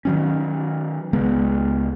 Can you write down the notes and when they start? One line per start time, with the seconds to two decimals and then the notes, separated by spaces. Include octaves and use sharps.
0.05 D#3 F#3 C#4
1.13 C#2 G#3 B3